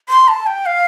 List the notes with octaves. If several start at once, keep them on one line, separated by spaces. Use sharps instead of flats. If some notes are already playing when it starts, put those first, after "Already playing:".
C6
A5
G5
F5